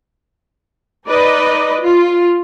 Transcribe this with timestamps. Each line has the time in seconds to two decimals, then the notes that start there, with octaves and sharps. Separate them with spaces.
1.08 D#4 B4 D5 D#5
1.81 F4